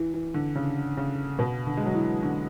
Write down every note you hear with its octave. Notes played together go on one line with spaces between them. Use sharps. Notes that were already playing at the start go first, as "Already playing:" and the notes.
Already playing: E3
E3
D3
C#3
C#3
B2
D3
G#3
F#3
E3
D3